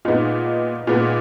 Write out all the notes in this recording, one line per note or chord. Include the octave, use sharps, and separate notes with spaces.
A#2 G#3 B3 D#4
A#2 G#3 B3